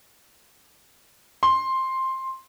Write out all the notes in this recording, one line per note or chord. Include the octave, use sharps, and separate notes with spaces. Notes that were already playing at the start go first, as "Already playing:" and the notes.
C6